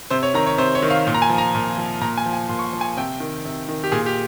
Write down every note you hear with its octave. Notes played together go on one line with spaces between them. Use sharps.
C3 C5
C#5
D#3 A#5
C#5
C3 C5
C#5
D#3
F5
A#2
A#5
G#5
F3
A#5
A#2
F3
A#2 A#5
G#5
F3
G#5
A#2 C6
C#6
C6
F3
G#5
C3 G5
D#3
C3
D#3
G4
A#2 G#4
G4